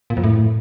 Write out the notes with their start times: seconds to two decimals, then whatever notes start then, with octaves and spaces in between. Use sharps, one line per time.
0.10 A#2
0.17 F2
0.24 A2